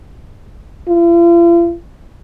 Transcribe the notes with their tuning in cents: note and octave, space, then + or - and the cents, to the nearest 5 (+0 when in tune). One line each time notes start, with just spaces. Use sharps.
F4 -45